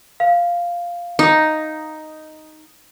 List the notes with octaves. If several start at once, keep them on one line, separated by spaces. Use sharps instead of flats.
F5
D#4